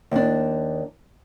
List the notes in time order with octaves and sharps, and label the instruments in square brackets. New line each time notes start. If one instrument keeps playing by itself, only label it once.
[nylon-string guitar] D#2 D4